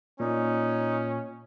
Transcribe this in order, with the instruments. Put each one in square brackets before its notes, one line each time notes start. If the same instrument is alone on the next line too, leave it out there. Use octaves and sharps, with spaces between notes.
[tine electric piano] A#2 [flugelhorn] C#4 [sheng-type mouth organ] D#4